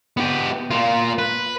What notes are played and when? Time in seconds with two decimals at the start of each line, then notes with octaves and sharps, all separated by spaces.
0.17 B3 G4
0.71 A#3 F4
1.18 B4